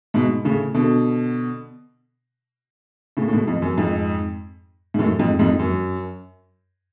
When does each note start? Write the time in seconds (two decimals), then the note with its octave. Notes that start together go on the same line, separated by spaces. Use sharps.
0.14 G#2 B2
0.45 A2 C#3
0.74 B2 D3
3.17 A2 C#3
3.28 A2
3.32 G#2 B2
3.47 F2
3.62 F#2
3.77 F2 G#2
4.94 G#2
4.99 F#2 A2
5.19 F2 G#2
5.39 F2 G#2
5.59 F#2